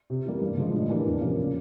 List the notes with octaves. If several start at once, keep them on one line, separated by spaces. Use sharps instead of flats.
C3
E3 G3 A#3
G2
D3 F3 G#3
A2
E3 G3 A#3 D4
E2
C3 F3 A#3 C#4
C#3